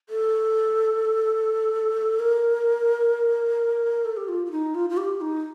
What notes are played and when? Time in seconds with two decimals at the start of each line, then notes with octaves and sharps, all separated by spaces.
0.09 A4
2.20 A#4
4.05 A4
4.17 G4
4.28 F4
4.46 F4
4.52 D#4
4.75 F4
4.90 F4
4.97 G4
5.21 D#4